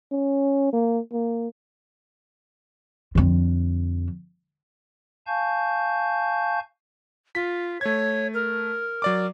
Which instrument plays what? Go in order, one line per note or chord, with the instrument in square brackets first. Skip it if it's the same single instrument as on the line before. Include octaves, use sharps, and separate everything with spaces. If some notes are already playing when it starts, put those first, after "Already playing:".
[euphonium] C#4
A#3
A#3
[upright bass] F2 D3
[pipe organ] F5 G#5 A5 C#6 G6
[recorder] F4 [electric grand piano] B6
[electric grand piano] A3 G#6 [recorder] C#5
[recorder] A#4
[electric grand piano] F#3 D5 D6